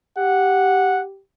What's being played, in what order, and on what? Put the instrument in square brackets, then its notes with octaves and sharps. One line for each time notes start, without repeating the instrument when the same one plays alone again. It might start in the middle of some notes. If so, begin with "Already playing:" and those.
[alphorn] G4 [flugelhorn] F#5